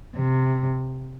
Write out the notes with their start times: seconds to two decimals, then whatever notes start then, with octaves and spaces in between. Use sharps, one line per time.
0.15 C3